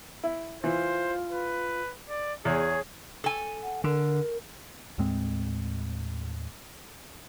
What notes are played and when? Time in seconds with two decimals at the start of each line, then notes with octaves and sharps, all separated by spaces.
0.24 E4
0.64 E3 F4 C5
1.32 B4
2.09 D5
2.45 E2 G#4 C#5
3.24 A4 G#5
3.63 F#5
3.84 D3 A#4
4.98 D#2 A2 G#3 C4